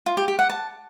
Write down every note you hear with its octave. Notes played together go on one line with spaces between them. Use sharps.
F4
G4
G4
F#5
A5